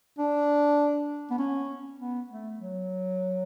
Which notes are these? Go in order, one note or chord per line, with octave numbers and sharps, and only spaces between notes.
D4
B3
C#4
B3
A3
F#3